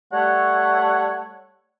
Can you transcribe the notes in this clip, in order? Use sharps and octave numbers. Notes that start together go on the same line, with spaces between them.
G3 A3 C#5 F#5